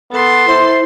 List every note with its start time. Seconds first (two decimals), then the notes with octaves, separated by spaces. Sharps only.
0.12 B3 A4 C6
0.48 E4 C5